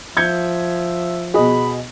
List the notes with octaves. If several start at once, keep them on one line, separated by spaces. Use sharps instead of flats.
F3 E5 G6 G#6 C#7
B2 F#4 G#4 D#5 B5